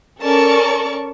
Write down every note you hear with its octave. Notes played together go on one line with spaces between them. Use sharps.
C#4 A4 A#4 D5 A5 C#6